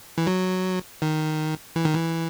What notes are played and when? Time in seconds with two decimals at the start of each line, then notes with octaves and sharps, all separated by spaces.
0.18 E3
0.27 F#3
1.02 D#3
1.76 E3
1.85 D#3
1.95 E3